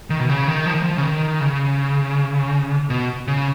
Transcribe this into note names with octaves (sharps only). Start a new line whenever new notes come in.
D#3
B2
C#3
D#3
F3
D#3
F3
C#3
D#3
C#3
B2
C#3